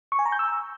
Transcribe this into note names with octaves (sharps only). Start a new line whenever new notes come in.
C#6
G#5
A#5
G6
E6